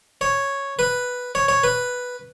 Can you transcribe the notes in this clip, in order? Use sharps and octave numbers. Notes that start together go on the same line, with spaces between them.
C#5
B4
C#5
C#5
B4